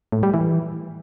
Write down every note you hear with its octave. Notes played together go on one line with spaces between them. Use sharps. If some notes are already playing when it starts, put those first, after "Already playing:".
A2
G3
E3